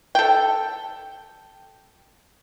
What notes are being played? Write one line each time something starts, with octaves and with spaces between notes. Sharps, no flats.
A4 G5